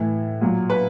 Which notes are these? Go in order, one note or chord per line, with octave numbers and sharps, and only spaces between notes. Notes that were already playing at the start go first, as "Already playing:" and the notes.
Already playing: A2 E3
A#2 F#3
B4